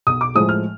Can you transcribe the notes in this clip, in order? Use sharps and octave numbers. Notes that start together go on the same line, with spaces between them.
B1 D#6
D6
A2 F3 G#3 D#6
F6